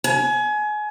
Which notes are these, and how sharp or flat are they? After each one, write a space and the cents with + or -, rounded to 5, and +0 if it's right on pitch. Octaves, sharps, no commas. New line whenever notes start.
G#5 +30